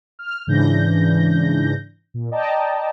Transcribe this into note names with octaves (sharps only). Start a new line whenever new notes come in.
F6
G#2 C#3 E3 D4 G6 A#6
A#2
D5 D#5 G5 A5 A#5